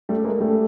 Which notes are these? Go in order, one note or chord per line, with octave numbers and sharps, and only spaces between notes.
G3 A3
G#3 A#3
G3 A3